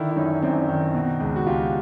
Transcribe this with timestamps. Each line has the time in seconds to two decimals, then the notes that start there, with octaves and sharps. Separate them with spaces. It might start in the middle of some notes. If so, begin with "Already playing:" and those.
Already playing: D3 D#3 D4 E4
0.10 E4
0.16 F#2 C#4 D#4
0.42 F#2 C4 D4
0.69 D#3
0.94 B2
1.20 C#2
1.36 F#4
1.46 C#2 F4 G4